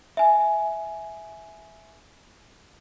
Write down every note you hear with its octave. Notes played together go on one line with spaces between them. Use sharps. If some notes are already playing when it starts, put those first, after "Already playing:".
E5 G#5